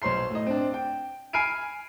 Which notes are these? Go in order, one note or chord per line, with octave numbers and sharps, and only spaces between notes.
B1 C5 C#5 C6 C7
A2 D#5
C4 D4
G5
G#5 B5 F6 C7 D7 D#7